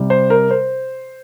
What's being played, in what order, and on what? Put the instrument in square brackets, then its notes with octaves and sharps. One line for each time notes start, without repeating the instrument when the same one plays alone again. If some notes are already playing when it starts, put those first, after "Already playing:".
Already playing: [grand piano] C3 G3
C5
A#4
C5